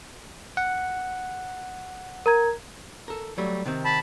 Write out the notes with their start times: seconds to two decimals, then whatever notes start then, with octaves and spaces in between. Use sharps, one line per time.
0.57 F#5
2.26 A#4 A#5 G#6
3.08 A4 A#4
3.38 F#3 G3 A3
3.66 C3 D#3 C4
3.85 A5 B5